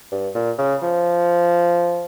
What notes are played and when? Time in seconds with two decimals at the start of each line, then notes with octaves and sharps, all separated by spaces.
0.12 G2
0.35 A#2
0.58 C#3
0.82 F3